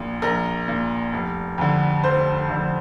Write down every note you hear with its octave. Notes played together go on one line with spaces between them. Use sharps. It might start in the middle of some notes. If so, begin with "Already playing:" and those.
Already playing: A#1 A#2
A#1 A#4
A#2
F1
F2 D3
F1 C5
F2 D3